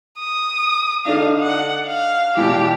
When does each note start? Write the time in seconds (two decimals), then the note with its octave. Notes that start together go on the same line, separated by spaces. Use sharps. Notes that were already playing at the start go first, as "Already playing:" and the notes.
0.18 D#6
1.05 D3 D4 D#4 F5
1.40 F#5
1.87 F5
2.37 E2 B2 E3 G4